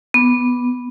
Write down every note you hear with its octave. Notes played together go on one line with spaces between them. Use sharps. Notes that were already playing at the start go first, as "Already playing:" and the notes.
B3